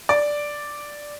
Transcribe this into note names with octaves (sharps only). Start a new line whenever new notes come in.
D5